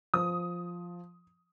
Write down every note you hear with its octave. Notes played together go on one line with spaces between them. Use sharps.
F3 D#6